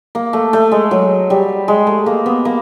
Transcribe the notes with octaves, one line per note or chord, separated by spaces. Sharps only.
A#3
A3
A3
G#3
F#3
G3
G#3
A3
A#3
B3
A#3